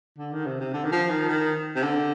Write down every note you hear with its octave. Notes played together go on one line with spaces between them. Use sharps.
D3
D#3
C3
C3
D3
D#3
F3
D#3
D#3
C3
D3